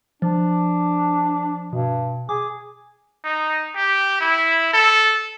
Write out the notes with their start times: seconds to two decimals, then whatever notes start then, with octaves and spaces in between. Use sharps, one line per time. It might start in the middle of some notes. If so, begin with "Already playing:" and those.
0.22 F3 D4
1.73 G2 B2
2.29 G#4 D6
3.24 D#4
3.75 G4
4.20 E4
4.73 A4